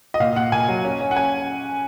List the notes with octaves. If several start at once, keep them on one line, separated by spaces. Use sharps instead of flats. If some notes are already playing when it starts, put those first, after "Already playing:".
D#5
A#2 F5
A#2 F#5
A#2 G#5
F#3
C#4
C#4
F#5
C#4 G#5